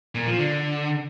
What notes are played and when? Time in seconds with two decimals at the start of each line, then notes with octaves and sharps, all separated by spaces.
0.15 A#2
0.26 F3
0.38 D3